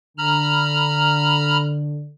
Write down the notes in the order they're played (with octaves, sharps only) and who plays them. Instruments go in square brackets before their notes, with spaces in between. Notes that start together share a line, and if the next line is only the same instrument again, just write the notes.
[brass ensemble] D3 [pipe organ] A#5 B5 F6